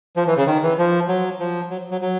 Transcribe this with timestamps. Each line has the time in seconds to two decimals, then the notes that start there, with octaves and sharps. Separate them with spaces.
0.17 F3
0.27 E3
0.37 C#3
0.47 D#3
0.63 E3
0.78 F3
1.08 F#3
1.39 F3
1.70 F#3
1.91 F#3
2.01 F#3